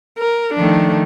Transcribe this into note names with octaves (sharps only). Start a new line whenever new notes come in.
A#4
D#3 F3 A3 D4